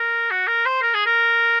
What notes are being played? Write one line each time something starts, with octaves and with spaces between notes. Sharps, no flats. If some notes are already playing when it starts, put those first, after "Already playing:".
Already playing: A#4
F#4
A#4
C5
A#4
G#4
A#4